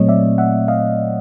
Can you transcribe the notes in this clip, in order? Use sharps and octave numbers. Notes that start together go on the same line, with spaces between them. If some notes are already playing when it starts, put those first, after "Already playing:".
Already playing: A#2 F#3 A3 C4 C#5 D#5
D5 E5
E5 F#5
D#5 F5